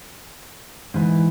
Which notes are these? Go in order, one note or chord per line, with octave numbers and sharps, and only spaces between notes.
G#2 E3